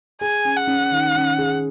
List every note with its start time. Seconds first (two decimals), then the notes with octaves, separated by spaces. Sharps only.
0.21 G#4 G#5
0.45 C#4
0.56 F#5
0.67 C#4
0.92 D#3
1.16 C#4
1.38 G#4